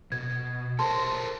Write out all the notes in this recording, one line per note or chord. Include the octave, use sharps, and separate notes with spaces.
B2 G#6
A4 A#4 C5 A5 C6